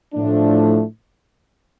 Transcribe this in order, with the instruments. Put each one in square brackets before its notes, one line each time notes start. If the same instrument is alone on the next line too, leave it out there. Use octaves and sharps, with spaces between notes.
[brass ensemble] A2 F3 A3 D4